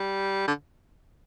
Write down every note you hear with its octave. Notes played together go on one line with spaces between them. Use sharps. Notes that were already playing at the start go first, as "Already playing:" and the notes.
Already playing: G3
D3